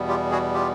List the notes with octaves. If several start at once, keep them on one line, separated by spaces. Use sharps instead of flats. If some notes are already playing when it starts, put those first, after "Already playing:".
Already playing: E2 B2 G3 B3
F4 G4
F#4 G#4
F4 G4